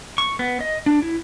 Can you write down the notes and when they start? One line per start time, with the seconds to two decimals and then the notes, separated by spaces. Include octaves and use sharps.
0.18 C#6
0.39 B3
0.61 D#5
0.86 D4
1.02 E4